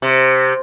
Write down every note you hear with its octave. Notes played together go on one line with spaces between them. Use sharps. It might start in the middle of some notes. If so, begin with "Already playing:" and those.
C3